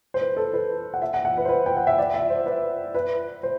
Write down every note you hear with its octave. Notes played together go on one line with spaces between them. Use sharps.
C5
B4
A4
B4
F#5
E5
F#5
F#5
B4
C5
B4
G5
F#5
E5
D5
E5
C5
B4
B4
C5